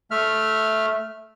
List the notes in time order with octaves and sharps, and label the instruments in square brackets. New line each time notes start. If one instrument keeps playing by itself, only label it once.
[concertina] A3 E5 F6